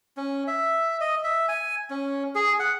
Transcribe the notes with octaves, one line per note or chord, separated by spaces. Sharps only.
C#4
E5
D#5
E5
G#5
C#4
G#4
F#5